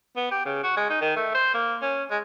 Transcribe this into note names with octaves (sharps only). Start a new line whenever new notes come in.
B3
G4
C#3
F#4
G#3
D#4
D#3
A3
C5
A#3
C#4
G#3